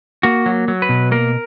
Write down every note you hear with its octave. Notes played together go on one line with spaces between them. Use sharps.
A#3 F#4
F#3
F#3
B4
B2
A#3 A#4